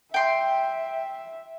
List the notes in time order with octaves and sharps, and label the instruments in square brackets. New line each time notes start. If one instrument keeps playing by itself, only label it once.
[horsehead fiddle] E5 [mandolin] G5 C6